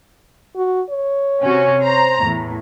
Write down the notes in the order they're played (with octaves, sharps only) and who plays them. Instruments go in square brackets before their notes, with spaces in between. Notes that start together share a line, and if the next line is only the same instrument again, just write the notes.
[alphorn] F#4
C#5
[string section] C3 C#4 F#4
C5 A#5
E2 A2